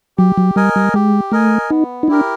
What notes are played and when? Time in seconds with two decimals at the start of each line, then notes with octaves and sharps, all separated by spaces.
0.18 F#3 G4
0.37 F#3
0.56 G3 A#4 D#5 G#5
0.76 G3
0.94 G#3 G4
1.32 A3 A#4 D#5 G#5
1.70 B3 D#4
2.03 D#4
2.08 D4 E4 G4 A#4